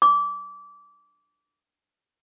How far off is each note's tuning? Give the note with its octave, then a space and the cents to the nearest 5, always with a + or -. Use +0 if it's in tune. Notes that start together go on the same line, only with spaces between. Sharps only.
D6 -20